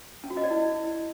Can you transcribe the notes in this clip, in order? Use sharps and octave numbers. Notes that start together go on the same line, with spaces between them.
C#4
F#4
D#5
D5
E4